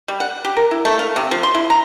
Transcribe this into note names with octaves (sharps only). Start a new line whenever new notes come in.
G3
F#5
G4
A#4
E4
A3
F5
C3
F3
C6
E4
A#5